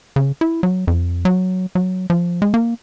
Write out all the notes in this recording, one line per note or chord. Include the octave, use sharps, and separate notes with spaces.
C#3
E4
F#3
F2
F#3
F#3
F3
G#3
A#3